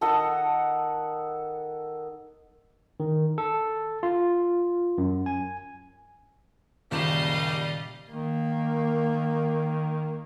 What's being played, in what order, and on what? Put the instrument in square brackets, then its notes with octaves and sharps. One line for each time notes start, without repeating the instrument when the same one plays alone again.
[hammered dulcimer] D#3 A4 D#5 F#5
[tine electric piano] D#3
A4
F4
F#2
G#5
[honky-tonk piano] F#1 E7 [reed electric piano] A#2 D#3 [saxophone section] G3 [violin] D#5 F5
[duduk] D#3 [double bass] A#3